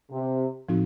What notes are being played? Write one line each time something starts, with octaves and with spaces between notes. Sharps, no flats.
C3
A2 F3 C4 D#4 F#4